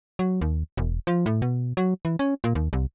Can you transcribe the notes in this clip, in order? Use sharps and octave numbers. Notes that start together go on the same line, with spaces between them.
F#3
D#2
E1
F3
A2
B2
F#3
E3
C#4
A#2
D#2
C2